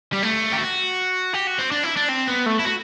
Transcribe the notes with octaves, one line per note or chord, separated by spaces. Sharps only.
G3
A3
G4
F#4
G4
F#4
C4
D4
E4
D4
C4
B3
A3
E4
F#4